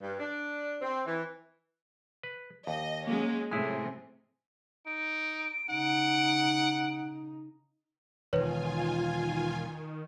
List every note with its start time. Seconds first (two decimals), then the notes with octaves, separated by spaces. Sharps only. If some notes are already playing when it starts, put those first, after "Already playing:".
0.01 G2
0.20 D4
0.82 C4
1.06 E3
2.23 B4
2.67 D#2 D#5
3.07 F#3 G#3 A#3 C#4
3.51 A2 C3 G#3 E4 G#4 G#5
4.86 D#4 D7
5.70 C#3 D#4 F#5
8.33 E1 D#3 F4 B4 C#5 G#5